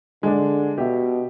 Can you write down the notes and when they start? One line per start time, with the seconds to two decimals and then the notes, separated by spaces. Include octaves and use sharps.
0.23 D3 G#3 D4
0.78 B2 G4 E5